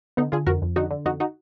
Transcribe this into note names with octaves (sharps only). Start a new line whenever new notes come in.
D3 B3 D#4
D3 F4 G#4
F2 F#4 A#4
F2
D3 D#4 F#4
D3
F2 D#4 F#4
D#4 F#4